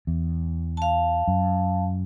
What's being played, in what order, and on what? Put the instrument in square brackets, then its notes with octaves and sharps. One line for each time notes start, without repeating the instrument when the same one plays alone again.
[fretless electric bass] E2
[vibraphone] F5 A5
[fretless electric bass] F#2